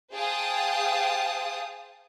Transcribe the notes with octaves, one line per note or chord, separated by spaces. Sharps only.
G#4 C5 F5 G5 A5 D#6